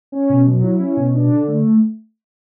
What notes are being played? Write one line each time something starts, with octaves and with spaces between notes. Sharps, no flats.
C#4
B2
F#3
E4
C#4
B2
D4
D3
A3